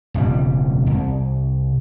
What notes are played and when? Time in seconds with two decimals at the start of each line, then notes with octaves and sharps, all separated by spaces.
0.14 E1 C#2 D#3 G3
0.86 C2